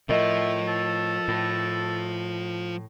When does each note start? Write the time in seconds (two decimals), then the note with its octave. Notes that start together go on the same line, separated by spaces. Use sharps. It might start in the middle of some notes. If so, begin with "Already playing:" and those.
0.09 A2 F3 A#4 D#5 E5
0.68 A4
1.28 A2